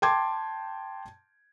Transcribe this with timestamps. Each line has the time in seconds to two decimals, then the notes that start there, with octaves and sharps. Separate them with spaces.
0.02 G5 A5 C6 D6 G#6